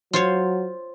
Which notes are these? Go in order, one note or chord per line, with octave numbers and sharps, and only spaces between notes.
F#3 F4 C5 C#5